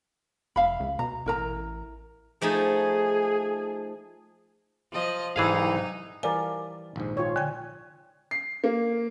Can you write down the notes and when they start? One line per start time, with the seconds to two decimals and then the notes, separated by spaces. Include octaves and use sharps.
0.56 F1 E5 F5 B5
0.80 C#2
0.99 B2 A#5
1.26 A1 E4 A#4 A#5
2.41 F3 A3 D#4 G#4
4.92 F3 D#5
5.36 C2 G#2 E3 F#3 D#4 G#4 F5
6.23 E3 F3 G3 A#4 D5 F5 G#5
6.96 A#1 D#2 G#2
7.17 F4 C#5
7.36 D3 G5 G#5
8.31 C7
8.64 A#3